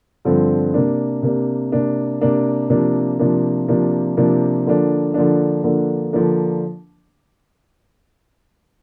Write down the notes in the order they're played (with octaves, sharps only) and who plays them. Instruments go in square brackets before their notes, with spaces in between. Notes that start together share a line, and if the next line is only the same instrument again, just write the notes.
[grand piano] G2 D3 F3 C4
C3 A#3 D4
C3 A#3 D4
C3 A#3 D4
C3 A#3 D4
C3 F3 A#3 D4
C3 F3 A#3 D4
C3 F3 A#3 D4
C3 F3 A#3 D4
D3 F3 A#3 D4
D3 F3 A#3 D4
D3 F3 A#3 D4
D3 F3 A#3 D4